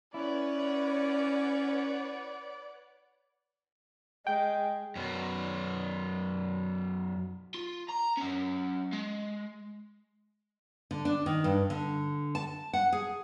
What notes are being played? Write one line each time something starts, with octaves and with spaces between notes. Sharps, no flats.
C#4 E4 B4 C#5 D5 F#5
G#3 G5
F#2 B2
F4
A#5
F#3 C#4
G#3
D3
D4
D#3
G2
D3
A5
F#5
G#4